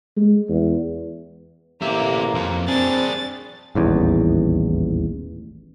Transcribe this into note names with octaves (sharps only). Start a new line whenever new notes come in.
G#3
E2
A1 A#3 G4 E5
F2
C4 D4 G#4 A6
D#1 A1 E2